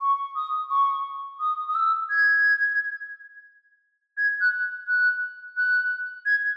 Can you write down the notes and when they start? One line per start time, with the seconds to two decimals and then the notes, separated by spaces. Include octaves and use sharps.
0.01 C#6
0.36 D#6
0.70 C#6
1.40 D#6
1.69 D#6
1.75 E6
2.10 G#6
4.17 G#6
4.41 F#6
4.87 F#6
5.57 F#6
6.26 G#6